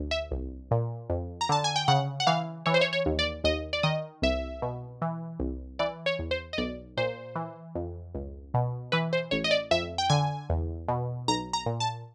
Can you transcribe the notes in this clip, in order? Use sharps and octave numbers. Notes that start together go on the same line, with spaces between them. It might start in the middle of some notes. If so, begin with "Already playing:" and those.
Already playing: D2
E5
C2
A#2
F2
A#5
D3 A5
G#5
G5
C#3 F#5
F#5
E3 F5
E3 C#5
C5
C#5
C#5
D#2
D5
D#2 D#5
D5
D#3 D#5
C2 E5
B2
E3
C2
E3 D5
C#5
E2
C5
D#5
B1 D5
A#2 C5
E3
F2
C#2
B2
E3 B4
C5
A1 C#5
D#5
D5
F2 E5
G5
D3 G#5
E2
B2
B1 A#5
A#5
A#2
A5